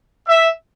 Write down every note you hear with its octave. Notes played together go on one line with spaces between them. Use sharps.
E5